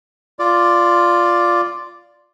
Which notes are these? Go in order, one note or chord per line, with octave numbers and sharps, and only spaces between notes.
F4 D5